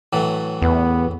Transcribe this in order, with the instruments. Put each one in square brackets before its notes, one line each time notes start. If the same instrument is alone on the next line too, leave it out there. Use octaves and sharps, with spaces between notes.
[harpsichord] A2 E3 F#3
[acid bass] E2 [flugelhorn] B3